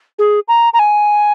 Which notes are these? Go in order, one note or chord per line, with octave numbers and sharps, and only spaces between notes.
G#4
A#5
A#5
G#5